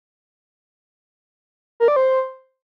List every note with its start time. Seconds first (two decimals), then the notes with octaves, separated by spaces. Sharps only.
1.80 A#4
1.88 D5
1.96 C5